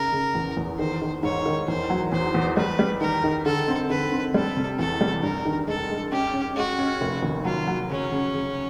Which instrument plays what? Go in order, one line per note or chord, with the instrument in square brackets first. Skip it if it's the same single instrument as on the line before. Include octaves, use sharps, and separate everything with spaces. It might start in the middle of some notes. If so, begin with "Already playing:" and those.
Already playing: [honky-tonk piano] C#3 D#4 [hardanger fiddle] A#4
[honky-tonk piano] C#3
E2
E2
[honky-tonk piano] D#3 [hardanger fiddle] C5
[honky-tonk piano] D#3
[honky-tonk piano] G#2 [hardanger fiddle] C#5
[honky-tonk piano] D#3
[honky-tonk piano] E2 [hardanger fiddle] C5
[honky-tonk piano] F#3
[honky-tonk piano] E2 [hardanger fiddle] C5
[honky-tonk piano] E2
[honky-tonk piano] G3 [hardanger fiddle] B4
[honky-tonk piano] G3
[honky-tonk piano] D#3 [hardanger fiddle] A#4
[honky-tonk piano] D#3
[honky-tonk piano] D3 [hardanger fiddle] A4
[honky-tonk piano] C4
[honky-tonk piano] D3 [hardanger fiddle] B4
[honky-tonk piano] C4
[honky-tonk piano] G3 [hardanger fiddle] A4
[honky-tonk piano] C3
[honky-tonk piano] E2 [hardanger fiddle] A4
[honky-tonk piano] G3
[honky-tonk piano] G2 [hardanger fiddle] A#4
[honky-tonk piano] D#3
[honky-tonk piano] G#3 [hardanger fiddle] A4
[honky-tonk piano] G#3
[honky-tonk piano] C#4 [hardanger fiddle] G4
[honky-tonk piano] C#4
[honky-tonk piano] G#3 [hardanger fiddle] F#4
[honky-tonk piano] C#4
F1
D#2
[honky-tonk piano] F#3 [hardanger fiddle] F4
[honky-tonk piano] F#3
[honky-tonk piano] C#3 [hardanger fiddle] C#4
[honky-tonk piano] C#3
C#3